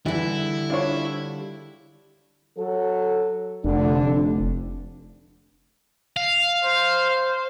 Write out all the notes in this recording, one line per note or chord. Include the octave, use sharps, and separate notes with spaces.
D3 E3 G3 E4
D4 F4 C#5
F#3 A4
F1 D3 D4
F5
C5